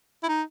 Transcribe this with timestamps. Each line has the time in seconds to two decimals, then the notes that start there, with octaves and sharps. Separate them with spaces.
0.23 E4
0.28 D#4